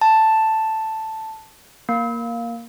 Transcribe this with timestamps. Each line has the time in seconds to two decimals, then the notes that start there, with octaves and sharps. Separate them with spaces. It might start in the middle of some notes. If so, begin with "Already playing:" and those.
0.01 A5
1.89 A#3